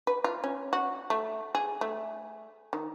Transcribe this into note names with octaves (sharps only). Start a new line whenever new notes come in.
B4
F4
C#4
F#4
A3
G#4
A3
D#3